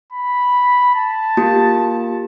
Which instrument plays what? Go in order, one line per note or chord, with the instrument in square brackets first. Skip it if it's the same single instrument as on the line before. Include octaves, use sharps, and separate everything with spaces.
[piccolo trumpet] B5
A5
[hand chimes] A#3 F4 G4